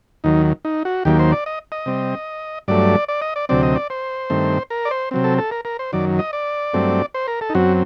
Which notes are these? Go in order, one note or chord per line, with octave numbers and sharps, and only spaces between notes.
D#2 D#3 F#3 D#4
D#4
F#4
D#2 D#3 F#3 A#3 G4
C5
D5
D#5
D#5
C3 G3 C4
G2 F#3 A3 D5
D5
D#5
D5
D2 C3 F#3 C4 D5
D#5
D5
C5
G2 D#3 A3 C4
A#4
D5
C5
C3 F#3 C4
A4
A4
A#4
A#4
C5
F#2 D#3 F#3 D5
D#5
D5
G2 F#3 A3 C4
C5
A#4
A4
D#4
F#2 F#3 C4 F#4